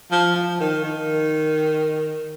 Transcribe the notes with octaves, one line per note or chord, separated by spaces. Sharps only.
F3
F3
D#3
D#3